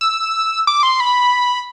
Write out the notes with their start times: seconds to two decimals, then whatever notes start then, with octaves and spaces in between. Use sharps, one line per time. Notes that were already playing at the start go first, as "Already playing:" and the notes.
0.01 E6
0.67 D6
0.83 C6
1.00 B5